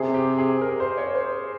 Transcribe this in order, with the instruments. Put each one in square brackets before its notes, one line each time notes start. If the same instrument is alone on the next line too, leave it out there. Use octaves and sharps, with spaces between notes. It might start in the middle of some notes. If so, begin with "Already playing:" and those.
Already playing: [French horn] C3 [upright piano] G#4
[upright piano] G4
G#4
A#4
C5
C#5
C5